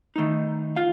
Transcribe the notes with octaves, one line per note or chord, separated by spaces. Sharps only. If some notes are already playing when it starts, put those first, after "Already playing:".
D#3 A3 D#4
F4 F5